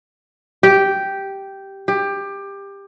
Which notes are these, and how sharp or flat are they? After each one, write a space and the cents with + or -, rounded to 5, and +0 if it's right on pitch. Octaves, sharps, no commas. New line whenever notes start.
G4 -5
G4 +20